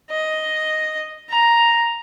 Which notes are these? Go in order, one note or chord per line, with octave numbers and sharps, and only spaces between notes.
D#5
A#5